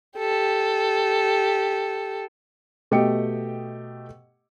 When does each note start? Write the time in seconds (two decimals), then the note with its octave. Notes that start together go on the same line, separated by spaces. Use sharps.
0.18 G4 A4
2.91 B2 A3 G4 D#5 G5 C#7